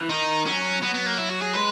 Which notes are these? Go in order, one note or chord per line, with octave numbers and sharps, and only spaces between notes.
E3
D#3 D#4
F#3 C#4
F#3 B3
B3
A#3
E4
F#4
G#4
G#3 B4